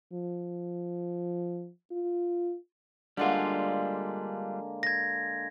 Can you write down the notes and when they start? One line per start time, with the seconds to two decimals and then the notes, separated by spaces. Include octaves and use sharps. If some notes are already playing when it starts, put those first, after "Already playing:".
0.13 F3
1.91 F4
3.17 D3 G3 G#3 A#3 D4 F4
4.83 G#6 A#6